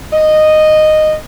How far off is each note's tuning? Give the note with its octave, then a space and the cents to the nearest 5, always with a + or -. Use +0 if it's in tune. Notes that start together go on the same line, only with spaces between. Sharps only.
D#5 -10